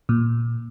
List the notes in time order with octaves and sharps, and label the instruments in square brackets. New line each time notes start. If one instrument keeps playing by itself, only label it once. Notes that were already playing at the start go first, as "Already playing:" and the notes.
[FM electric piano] A#2